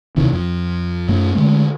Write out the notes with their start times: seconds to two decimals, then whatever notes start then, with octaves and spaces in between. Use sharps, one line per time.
0.17 D#2 C3 E3
0.32 F2
1.09 F#2 A3
1.35 D3 G#3 A3